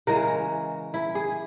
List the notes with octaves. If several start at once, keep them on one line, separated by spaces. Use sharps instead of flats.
C#3 E3 G#3 A#4
E4
G#4